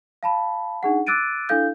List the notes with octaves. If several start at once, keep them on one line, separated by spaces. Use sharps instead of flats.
F5 A5 B5
D4 D#4 G#4 F#5
D6 E6 F#6 A6 D7 D#7
D4 E4 A4 F5 G6